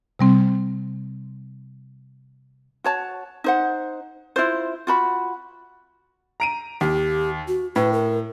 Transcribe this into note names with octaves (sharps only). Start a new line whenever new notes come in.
C3 G3 C4
F#4 C#5 A5
D#4 C5 F#5
E4 F4 C5
F4 F#4 B5
A#5 D7 D#7
D#2 G4
F#4
A2 B4
A#4